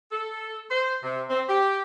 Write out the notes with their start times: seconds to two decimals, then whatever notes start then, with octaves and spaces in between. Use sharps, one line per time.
0.11 A4
0.70 C5
1.03 C3
1.29 C4
1.47 G4